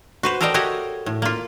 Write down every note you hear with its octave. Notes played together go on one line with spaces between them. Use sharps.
F#4 B4 C5
A4 A#4 C5 D5 D#5 G5
F#4 G4 C#5 D#5 E5
A2
A#3 F4